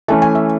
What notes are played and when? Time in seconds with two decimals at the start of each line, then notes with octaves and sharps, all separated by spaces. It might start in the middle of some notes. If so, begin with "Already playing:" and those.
0.08 E3 A3 C#4 A5
0.22 G#5
0.35 E5